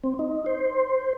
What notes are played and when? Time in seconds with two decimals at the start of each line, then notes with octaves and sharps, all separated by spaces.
0.03 C4
0.19 D#4
0.46 C5